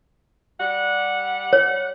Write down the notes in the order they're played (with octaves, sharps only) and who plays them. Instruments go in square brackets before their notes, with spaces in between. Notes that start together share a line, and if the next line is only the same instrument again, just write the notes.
[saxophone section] G3 F#5
[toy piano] C#5